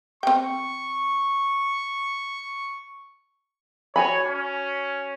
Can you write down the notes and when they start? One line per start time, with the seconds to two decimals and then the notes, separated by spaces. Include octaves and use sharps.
0.23 C4 G5 C#6
3.96 F#4 C#5 G#5 B5
4.26 C#4